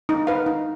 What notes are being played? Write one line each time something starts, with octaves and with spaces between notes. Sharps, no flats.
D#4
B4 F5
D#4